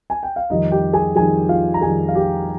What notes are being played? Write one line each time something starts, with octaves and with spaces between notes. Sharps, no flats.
G#5
G5
F5
F2 D#3 G3 D#4 D#5
G4 G5
G#4 G#5
F2 D#3 G3 G#4 G#5
F4 F5
A#5
F2 D#3 G3 G#4 G#5
F5
G4 G5